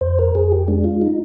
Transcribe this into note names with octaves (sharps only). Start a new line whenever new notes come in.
F2 C5
A#4
F2 G#4
G4
G#3 D4
F4
D#4